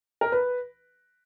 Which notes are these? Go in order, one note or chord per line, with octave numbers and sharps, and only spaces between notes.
A#4
B4